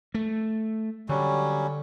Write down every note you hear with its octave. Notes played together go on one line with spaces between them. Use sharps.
A3
D3 F#3 G3 C#4